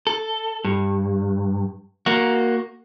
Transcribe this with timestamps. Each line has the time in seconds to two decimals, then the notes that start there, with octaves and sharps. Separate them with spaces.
0.07 A4
0.64 G2
2.06 A#3 F#4